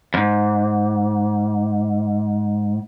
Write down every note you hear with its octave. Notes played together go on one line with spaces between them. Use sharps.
F2 G#2